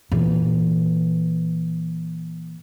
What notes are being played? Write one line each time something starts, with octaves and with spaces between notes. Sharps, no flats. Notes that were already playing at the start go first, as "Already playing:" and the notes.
A#2 E3